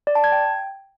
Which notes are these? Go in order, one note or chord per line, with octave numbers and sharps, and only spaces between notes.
D5
A5
G#6
G5